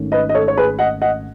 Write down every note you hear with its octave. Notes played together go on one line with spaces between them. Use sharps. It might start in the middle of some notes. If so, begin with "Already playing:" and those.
Already playing: G#1 G#2 D#3 A3 C#4
B4 D#5
D#5
A4 C#5
C#5
G#4 B4
D#5 F#5
D#5 F#5